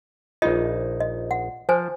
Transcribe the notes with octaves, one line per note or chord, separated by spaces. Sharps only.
A#1 D#4 F4 D#5
D#5
F#5
F3 C5 G#5